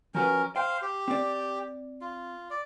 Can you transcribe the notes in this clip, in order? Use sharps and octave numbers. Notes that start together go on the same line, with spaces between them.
F3 C#4 F#4 A#4 B4
C5 F5 G5
G4
C4 D5
F4
D5